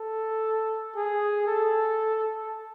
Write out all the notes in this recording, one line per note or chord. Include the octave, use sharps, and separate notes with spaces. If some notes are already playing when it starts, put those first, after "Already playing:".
Already playing: A4
G#4
A4